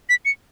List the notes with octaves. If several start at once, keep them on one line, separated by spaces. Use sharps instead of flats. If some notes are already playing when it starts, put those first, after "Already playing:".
B6
C#7